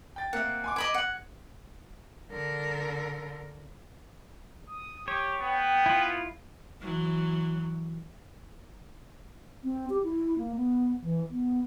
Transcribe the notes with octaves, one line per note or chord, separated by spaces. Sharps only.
G5 A6
A#3 C4 E5 F#5
G#5 C6 D6
D#5 B5 D6 G#6 A#6
F#5
D3 A#4
D#6
G4 C#5
B3 G5
E4 F4
E3 F#3
C4
G4
E4
A#3
B3
E3
B3